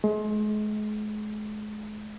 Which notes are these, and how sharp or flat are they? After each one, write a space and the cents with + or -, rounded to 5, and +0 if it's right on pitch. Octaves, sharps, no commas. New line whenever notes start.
G#3 +35